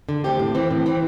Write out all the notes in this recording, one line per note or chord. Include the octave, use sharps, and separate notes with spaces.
D3
A3 C4 G4
A2
E3 C4
A2
E3 C4